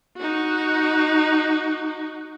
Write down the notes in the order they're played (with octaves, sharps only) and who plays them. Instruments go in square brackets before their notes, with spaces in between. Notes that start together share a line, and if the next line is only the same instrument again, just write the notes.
[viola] D#4 F#4